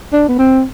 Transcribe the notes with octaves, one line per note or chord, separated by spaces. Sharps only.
D4
B3
C4